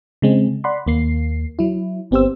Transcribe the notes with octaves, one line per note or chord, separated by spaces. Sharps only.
C#3 G#3 C4
D5 F#5 B5 C6
D#2 A#3 C7
F#3 E4
G1 B3 C4 G4 C5 E6